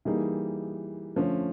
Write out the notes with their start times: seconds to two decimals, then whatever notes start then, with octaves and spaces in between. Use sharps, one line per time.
0.05 E3 G3 A#3 D#4 G#4
1.16 D3 F3 A3 C#4